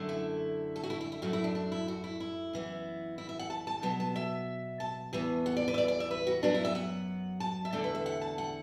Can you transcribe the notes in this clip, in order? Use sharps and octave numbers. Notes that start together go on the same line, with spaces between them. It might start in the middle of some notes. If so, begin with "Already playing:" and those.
Already playing: F#2 D3 A3
E4
A4
F#4
E4
E4
E4
F#2 F#3 A3 F#4
E4
D4
D4
E4
F#4
E4
E4
F#2 E3 B3
E4
E5
F#5
A5
A5
B2 F#3 B3 A5
A5
E5
A5
E2 E3 B3
F#5
D5
B4
E5
D5
D5
E5
B4
F#4
F#2 F#3 B3 D4
E4
E5
F#5
A5
E5
E2 D3 A3 D5
B4
E5
F#5
A5
F#5